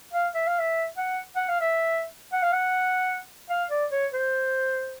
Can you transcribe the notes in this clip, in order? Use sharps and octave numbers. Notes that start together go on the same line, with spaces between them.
F5
E5
F5
E5
F#5
F#5
F5
E5
F#5
F5
F#5
F5
D5
C#5
C5